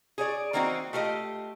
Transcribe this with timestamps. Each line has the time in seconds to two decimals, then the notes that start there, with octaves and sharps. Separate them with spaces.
0.18 G#4 C#5 D5
0.53 E3 A#3 C4 D#4 F4 F#4
0.93 A3 F4 G4 A#4 D#5